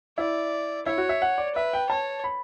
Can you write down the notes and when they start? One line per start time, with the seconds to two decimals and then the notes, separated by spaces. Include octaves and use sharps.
0.18 E4 D5
0.86 E4 C#5
0.98 F#4
1.09 E5
1.22 F#5
1.38 D5
1.55 B4 E5
1.73 G5
1.90 C#5 A5
2.24 B5